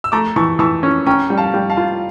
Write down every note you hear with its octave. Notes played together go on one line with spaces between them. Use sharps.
E6
A3 A#5 D6
E3 A5 C#6
E3 A5 C#6
C#4
C#4 G5 A#5
G3
F5 A5
G3
F5 A5
F4